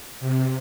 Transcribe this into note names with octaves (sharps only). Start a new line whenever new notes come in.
C3